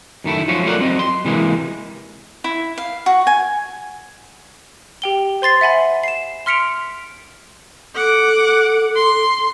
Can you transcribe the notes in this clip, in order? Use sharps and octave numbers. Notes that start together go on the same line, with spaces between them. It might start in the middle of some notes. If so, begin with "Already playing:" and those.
F#2 D#3 A3 E4
F3 F#3 C#4 F4 F#4
A3 E4 F4 A#4 D5 F#5
F#3 C4 D#5
C6
C3 E3 G#3 A#3
E4
F5
F#4
G#5
G4 G5 G7
C5 C6 A6 C7
E5 F#5 G#5 B5
C7 E7
C6 F6 B6 C#7 D7 F7
A4 F#5 D6
C6